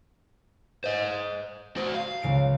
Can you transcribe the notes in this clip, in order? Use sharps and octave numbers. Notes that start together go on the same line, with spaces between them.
C5 D#5
F#4 C5
F5
C#2 C#3 D7